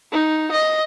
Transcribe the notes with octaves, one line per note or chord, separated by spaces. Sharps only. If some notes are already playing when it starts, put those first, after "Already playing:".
D#4
D#5